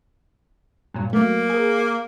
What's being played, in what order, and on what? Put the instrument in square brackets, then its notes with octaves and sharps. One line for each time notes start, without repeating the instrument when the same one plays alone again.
[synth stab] G2 A#2 F#3
[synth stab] F#3 A3 [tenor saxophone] A#3
[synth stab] G#4 A#4